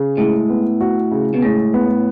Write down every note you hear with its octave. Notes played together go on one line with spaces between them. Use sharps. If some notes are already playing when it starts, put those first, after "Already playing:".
Already playing: C#3
A2 G#3
B3
F#4
C#3
B2
A2 G#3
B3